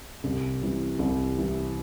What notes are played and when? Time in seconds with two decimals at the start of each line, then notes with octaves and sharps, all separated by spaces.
0.24 C2
0.61 C3 E3 G3
0.99 C2
1.38 C3 E3 G3